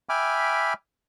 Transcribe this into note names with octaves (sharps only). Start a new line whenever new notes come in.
E5 G5 G#5 B5 D6 F6